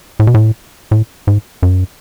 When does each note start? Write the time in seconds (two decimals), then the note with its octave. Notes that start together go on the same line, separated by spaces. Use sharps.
0.20 A2
0.27 B2
0.34 A2
0.91 A2
1.27 G#2
1.63 F#2